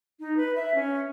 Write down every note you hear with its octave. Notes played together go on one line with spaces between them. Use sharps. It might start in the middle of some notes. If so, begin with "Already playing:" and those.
D#4
B4
E5
C#4